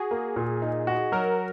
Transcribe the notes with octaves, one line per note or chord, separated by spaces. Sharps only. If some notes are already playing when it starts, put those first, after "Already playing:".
Already playing: F#4 G#4
A#3
A#2
D#4
F#4
F#3 A#4